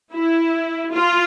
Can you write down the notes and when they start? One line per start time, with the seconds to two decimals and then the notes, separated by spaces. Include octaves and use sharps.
0.13 E4
0.92 F4